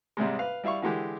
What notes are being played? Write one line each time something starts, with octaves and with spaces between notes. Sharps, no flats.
G#2 C3 G3 G#3
B4 F5
G3 E4 E5 F5 C#6
D3 E3 G#3 G4